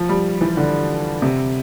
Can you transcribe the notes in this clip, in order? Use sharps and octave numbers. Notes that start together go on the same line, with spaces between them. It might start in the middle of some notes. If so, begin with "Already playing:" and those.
Already playing: F3
G3
E3
D3
C3